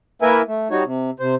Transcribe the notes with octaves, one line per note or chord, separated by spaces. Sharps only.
A#3 E4 A#4 B4 E5 G#5
A3
G3 D#4 F#4 C#5
C3
C3 C5